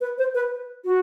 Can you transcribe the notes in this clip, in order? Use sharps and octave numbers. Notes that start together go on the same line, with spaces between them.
B4
C5
B4
F#4